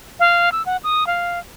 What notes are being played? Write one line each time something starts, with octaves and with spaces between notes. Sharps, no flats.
F5
E6
F#5
D#6
F5